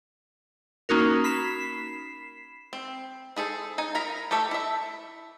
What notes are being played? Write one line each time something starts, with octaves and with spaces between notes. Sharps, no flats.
A#3 C#4 D#4 F#4 A#4
B5 B6 C7 E7
C4
E4 G#4 A4 C5
D#4 G#5
E4 A#4 A#5 B5
A3 G4 A4 E5 B5
E4 E5